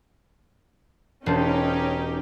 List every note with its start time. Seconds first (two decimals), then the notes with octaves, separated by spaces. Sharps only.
1.26 E1 C#4 D#4 G4 C5 A5